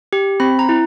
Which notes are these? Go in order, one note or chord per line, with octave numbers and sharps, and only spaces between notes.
G4
C4 B5
A#5
E4